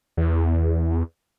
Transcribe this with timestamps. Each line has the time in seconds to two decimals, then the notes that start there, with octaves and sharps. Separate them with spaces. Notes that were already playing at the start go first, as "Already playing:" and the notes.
0.17 E2